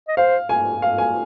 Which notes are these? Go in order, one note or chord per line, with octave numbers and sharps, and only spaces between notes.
D#5
C5 F5
G#5
F5
G#5